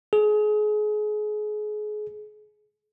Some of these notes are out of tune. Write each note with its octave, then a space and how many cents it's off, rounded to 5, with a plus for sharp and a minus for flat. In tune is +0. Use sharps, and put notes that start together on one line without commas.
G#4 +30